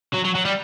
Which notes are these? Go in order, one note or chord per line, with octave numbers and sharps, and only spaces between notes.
F#3
F#3
F#3
G3